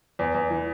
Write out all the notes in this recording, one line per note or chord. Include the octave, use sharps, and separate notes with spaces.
E2
E2
E3